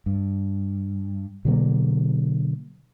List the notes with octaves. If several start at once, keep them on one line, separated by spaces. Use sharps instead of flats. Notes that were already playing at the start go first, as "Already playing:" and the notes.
G2
B2 D3 F#3 A#3